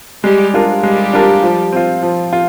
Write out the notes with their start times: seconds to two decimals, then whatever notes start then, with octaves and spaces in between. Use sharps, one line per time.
0.23 G3 G#3 G4
0.53 D4 F4 A#4
0.83 G3 G#3 G4
1.13 D4 F4 A#4
1.43 F3
1.72 C4 F4
2.02 F3
2.33 F4